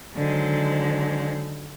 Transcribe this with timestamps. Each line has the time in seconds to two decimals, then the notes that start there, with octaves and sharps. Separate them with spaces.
0.16 D3 D#3 F#3 G#3 C5